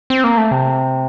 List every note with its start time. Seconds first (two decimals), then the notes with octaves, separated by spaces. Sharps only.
0.10 C4
0.24 A#3
0.37 A3
0.51 C3